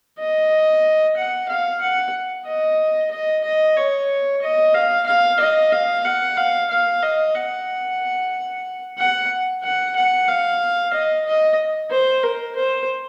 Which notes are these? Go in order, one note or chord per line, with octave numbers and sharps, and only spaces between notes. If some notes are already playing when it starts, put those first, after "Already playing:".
D#5
F#5
F5
F#5
D#5
D#5
D#5
C#5
D#5
F5
F5
D#5
F5
F#5
F5
F5
D#5
F#5
F#5
F#5
F#5
F5
D#5
D#5
C5
A#4
C5